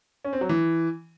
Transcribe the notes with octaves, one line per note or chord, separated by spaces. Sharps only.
C#4
C4
F#3
E3